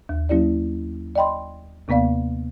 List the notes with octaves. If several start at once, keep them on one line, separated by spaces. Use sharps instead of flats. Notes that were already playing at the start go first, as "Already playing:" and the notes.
D#2
F#3 A#3 C#4 E4 G4 D5
D5 D#5 G5 B5 C6
D#2 C3 A#3 B3 D5 F5